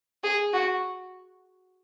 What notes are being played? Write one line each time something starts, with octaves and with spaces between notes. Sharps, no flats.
G#4
F#4